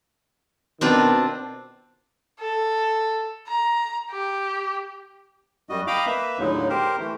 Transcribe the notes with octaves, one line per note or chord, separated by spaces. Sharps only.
B2 D#3 C4 D4 F4
A4
A#5
G4
F#2 G3 F#4 D#5
D#5 F5 G5 A#5 B5 D6
A#3 B4 E5
D#2 A2 D3 F#3 G#3 D#4
G4 A#4 C5
E3 A3